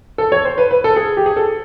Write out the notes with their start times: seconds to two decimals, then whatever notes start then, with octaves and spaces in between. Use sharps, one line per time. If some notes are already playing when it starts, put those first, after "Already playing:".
0.18 A4
0.32 C#5
0.45 C5
0.58 B4
0.71 B4
0.84 A4
0.96 G#4
1.17 G4
1.26 G#4
1.37 A4